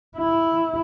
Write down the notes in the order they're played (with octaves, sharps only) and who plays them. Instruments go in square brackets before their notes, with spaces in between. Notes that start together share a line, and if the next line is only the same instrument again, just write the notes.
[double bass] E4